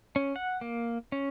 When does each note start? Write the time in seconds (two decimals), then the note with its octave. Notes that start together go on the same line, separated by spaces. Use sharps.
0.16 C#4
0.36 F#5
0.61 A#3
1.12 C#4